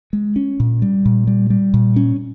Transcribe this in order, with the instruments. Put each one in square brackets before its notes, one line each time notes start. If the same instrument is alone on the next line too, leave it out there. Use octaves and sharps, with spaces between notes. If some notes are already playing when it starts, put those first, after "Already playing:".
[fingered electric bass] G#3
C#4
A#2
G3
A#2
G3
G3
A#2
C#4